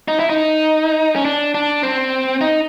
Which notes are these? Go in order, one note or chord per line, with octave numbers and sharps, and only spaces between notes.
D#4
E4
D#4
C#4
D4
D4
C4
D#4